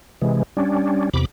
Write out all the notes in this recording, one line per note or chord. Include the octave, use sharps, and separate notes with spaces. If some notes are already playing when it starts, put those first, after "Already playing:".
C3 E3 G#3
G3 C#4 D4
E2 C3 B5 D6